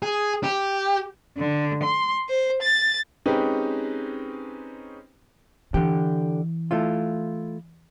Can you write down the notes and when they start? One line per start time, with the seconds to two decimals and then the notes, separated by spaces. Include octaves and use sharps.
0.03 G#4
0.43 G4
1.38 D3
1.83 C6
2.29 C5
2.61 A6
3.26 G#3 C4 C#4 D#4 G4 B4
5.74 D3 E3 G4
6.71 A3 E4 F4